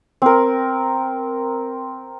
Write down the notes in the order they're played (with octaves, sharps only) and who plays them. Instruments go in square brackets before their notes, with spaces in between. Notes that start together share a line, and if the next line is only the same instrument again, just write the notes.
[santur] C4 A#4